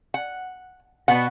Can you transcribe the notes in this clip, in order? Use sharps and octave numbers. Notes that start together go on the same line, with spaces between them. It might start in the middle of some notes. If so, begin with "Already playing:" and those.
F#5
B2 B3 F#4 F#5